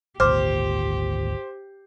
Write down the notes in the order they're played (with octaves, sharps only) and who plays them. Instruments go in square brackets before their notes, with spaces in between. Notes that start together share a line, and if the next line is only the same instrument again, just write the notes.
[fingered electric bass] G#1 D2 A#2 [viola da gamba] G4 [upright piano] C5 [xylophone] D6 F6